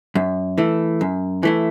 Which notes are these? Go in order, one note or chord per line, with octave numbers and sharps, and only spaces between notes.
F#2
E3 A3 E4
F#2
E3 A3 E4